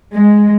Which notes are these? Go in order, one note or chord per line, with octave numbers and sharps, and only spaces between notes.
G#3